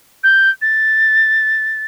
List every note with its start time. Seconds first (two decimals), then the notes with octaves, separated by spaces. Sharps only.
0.24 G6
0.62 A6